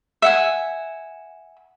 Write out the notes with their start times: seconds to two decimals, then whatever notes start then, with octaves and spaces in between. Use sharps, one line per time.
0.22 E5 F#5 G#5